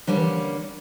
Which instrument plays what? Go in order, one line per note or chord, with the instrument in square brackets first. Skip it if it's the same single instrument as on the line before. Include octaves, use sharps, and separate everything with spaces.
[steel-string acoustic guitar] D3 G3 A#3 C#4 [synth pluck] F3
[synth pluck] E3